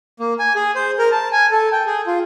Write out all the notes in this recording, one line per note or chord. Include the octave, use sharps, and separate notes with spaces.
A#3
G#5
G#4
C5
A#4
A5
G#5
A4
G5
G#4
F4